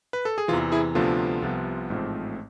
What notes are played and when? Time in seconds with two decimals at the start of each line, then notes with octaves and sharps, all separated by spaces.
0.13 B4
0.25 A4
0.38 G#4
0.48 E2 C3 E3 F4
0.72 E4 G#4
0.95 D2 C3 F3 B3 D4 F4 A4
1.42 C2 C3 F3 B3
1.90 A1 G#2 F3 A3 C4